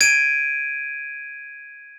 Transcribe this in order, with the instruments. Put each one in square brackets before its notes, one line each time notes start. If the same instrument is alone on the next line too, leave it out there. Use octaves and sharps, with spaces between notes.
[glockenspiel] G#6 D7 D#7